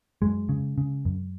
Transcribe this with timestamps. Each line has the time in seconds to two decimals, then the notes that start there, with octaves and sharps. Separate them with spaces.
0.22 F#2 G#3
0.49 C#3
0.78 C#3
1.05 F#2